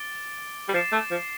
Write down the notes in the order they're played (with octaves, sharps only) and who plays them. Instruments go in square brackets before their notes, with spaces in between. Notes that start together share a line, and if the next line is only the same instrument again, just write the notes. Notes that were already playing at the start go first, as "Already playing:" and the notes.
Already playing: [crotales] D6 A6 D7 G7
[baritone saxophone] G3
[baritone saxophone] F3 [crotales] A6 C7 E7
[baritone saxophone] A3
F3